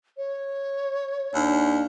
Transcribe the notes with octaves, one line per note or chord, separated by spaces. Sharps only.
C#5
D#2 D4